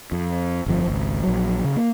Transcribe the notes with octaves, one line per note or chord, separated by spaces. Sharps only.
F2
G1 F2 F3
G#1 C#2
A#1 F#3
C#3
A#3